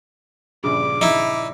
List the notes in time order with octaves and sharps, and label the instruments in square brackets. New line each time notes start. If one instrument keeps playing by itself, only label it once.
[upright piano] A#1 G2 C#3 [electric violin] D6
[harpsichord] D#4 E4